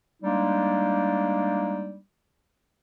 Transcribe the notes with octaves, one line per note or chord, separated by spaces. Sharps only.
G3 G#3 A#3 D4 D#4